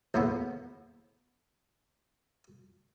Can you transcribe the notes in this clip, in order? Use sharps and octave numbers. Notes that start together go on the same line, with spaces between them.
D#2 A2 C#3 B3